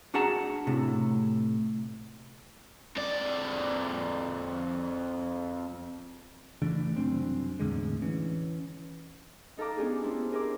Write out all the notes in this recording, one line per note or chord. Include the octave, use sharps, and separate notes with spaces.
D4 F#4 G#4 F#5 A5 A#5
A2 C3
F2 D5
C#3 E3 A3 D4
C2 F#2 C4 D4
E2 A2 D3 G#3
E3 C#4
D#4 A4 F5 A#5 D6
B3 C#4 D4 F4 G4 G#4
D4 E4 C5
G#4 A#4 C5 E5 D6